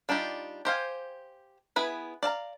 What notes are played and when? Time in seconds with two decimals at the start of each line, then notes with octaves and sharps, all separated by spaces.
0.09 G3 D4 D#4 F4 G4
0.65 G4 C5 F5 G#5
1.76 B3 E4 G#4 B4
2.23 D5 F5 A5 A#5